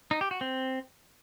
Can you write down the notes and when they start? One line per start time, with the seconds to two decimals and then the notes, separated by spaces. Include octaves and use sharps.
0.11 D#4
0.21 G4
0.31 F#4
0.41 C4